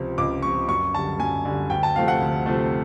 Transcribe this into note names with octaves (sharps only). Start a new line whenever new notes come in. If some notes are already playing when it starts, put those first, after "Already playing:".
Already playing: C#2 C3 F3
C#2 D6
C3 F3 C#6
F#2 C#6
D3 G3 A5
F#2 G#5
D3 G3
D2 G5
A5
C3 F3 A3 F5
F#5
D2
C3 F3 A3